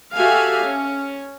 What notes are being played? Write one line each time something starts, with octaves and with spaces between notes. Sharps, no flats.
F#4 G4 A4 E5 F5 G#5
C#4